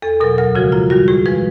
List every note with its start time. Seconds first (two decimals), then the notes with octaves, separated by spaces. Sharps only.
0.02 E2 A4
0.20 B2 F#3 A#4
0.38 D2 A#4
0.55 C#3 F3 G#3 F#4
0.72 F#2 F4
0.90 D#3 G3 F#4
1.08 A2 G#4
1.26 F3 G#3 B4